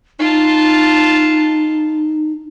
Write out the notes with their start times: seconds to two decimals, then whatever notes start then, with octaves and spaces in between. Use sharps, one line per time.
0.19 D#4 F4 A5